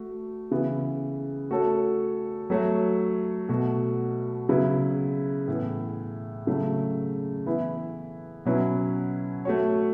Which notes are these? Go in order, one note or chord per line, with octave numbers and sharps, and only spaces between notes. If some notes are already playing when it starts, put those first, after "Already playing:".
Already playing: A3 F#4
C#3 E3 B3
A3 F#4 A4 C#5
F#3 A3 F#4 C#5
B2 A3 F#4
C#3 F#3 B3 E4
A2 E3 B3
C#3 F#3 A3
E3 B3 E4
B2 F#3 C#4 E4 B4
A3 F#4 C#5